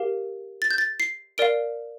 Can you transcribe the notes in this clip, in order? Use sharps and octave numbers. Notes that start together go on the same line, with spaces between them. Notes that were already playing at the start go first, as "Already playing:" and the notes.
Already playing: G4 A#4 F5
A6
G6
A6
C7
A#4 D5 F5 D7